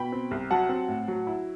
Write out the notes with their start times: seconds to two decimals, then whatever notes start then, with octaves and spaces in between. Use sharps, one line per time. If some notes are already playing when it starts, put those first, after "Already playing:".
Already playing: B2 G5 B5
0.12 C4
0.31 C2
0.51 F#3 F#5 A5
0.69 C4
0.88 A2
1.08 F#3
1.27 E4